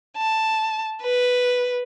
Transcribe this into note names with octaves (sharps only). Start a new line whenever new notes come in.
A5
B4